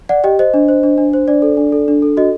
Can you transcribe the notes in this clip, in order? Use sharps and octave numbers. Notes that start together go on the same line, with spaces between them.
D5 F#5
G4 D#5 G5
C5 D#5
D4
C5
D4
D4
C5
D4 D5
A4
D4
A4
D4
A4
F#4 D#5